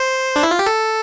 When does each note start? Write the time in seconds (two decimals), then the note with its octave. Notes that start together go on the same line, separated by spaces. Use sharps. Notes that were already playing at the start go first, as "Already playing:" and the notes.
Already playing: C5
0.36 D4
0.43 E4
0.51 F4
0.59 G4
0.66 A4